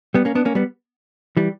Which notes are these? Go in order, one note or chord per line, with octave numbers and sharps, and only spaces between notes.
G3 B3
A#3 C#4
B3 D4
A#3 C#4
G3 B3
E3 G3